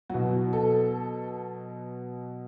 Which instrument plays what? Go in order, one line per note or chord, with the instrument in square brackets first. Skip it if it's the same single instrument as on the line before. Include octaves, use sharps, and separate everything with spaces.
[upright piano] B2 F#3 F#4
A4